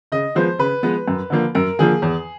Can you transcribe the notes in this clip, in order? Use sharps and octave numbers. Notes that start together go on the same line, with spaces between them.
C#3 D#5
F3 G#3 B3 C5
C#3 B4
F3 G#3 B3
F#2
D3 F3 A#3
F#2 A#4
D3 F3 A#3 G#4
E2